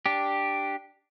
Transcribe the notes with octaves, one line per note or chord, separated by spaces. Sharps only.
D4 G4